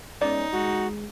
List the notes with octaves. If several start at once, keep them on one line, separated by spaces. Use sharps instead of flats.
G#3 B3 C#4 D#4 D5
G#3 F#4